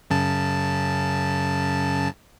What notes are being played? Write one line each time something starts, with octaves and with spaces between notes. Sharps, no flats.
F#2 C#3 A5